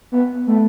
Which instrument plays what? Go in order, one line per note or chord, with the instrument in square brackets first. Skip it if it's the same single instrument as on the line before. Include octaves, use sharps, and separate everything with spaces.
[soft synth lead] B3
A3